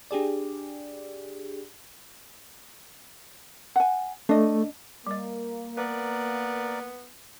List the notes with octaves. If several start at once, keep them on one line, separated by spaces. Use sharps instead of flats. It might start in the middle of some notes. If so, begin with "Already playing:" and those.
D4 G4 G#4 D5
F#5 G#5
A3 D4 D#5
G3 A#3 D#5
B3 A#4 B4 D5